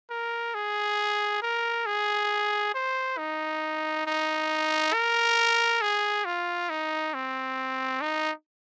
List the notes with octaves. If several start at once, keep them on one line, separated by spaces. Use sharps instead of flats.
A#4
G#4
A#4
G#4
C5
D#4
D#4
A#4
G#4
F4
D#4
C4
D#4